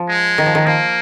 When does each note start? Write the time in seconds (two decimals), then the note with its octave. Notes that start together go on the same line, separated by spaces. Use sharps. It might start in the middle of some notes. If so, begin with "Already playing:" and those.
Already playing: F3
0.09 G#3
0.38 D#3
0.46 F3
0.55 D#3
0.66 F3 A#3